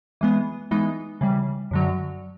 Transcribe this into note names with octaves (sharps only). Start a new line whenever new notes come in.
E3 G#3 B3
E3 G#3 B3 D#4
C#3 E3 G3
F#2 D3 F#3